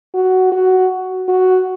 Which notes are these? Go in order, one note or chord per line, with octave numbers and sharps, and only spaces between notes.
F#4
F#4
F#4